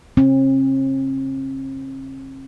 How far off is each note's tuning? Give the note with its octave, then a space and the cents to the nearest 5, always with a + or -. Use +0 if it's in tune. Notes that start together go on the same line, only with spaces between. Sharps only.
C4 +45